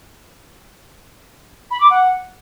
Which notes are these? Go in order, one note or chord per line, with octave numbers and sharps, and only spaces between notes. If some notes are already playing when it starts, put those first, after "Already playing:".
B5
D6
F#5